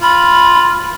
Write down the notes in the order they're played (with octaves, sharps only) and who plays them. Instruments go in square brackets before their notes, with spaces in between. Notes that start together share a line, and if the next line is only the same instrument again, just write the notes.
[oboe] F4 [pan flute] B5